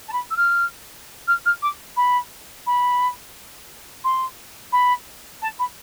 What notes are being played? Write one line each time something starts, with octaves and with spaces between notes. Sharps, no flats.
A5
B5
E6
F6
F6
F6
D6
B5
B5
C6
B5
A5
B5